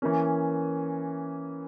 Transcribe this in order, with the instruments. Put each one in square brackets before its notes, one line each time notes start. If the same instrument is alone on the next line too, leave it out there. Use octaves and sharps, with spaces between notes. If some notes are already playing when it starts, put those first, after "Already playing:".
[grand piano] E3 A#3 C#4